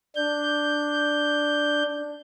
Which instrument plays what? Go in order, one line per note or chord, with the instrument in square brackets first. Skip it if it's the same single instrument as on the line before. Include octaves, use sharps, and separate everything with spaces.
[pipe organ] D4 G6